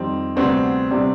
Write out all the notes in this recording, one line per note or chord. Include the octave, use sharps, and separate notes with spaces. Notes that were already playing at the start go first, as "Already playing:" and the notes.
Already playing: F2 D#3 G3 C4
D2 C3 G3 B3 C4 D4
C3 G3 B3 D4